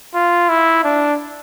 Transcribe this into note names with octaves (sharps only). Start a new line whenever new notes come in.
F4
E4
D4